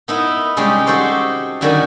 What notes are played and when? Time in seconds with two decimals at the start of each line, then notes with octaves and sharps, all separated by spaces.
0.08 B3 D#4 E4 A#4
0.57 C3 G3 G#3 C#4 D#4 G4
0.87 D#4 F#4 G4 A4 C5 C#5
1.61 F#2 D3 D#3 G3 F#4 G#5